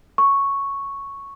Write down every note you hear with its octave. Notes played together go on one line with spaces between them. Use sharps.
C#6